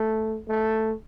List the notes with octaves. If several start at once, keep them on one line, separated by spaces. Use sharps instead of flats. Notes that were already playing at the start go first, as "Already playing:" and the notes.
Already playing: A3
A3